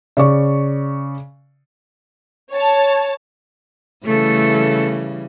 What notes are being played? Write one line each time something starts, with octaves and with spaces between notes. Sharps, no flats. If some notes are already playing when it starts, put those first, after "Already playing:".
C#3 D5 C#6
C#5 A5
C#3 E3 G3 A3 A4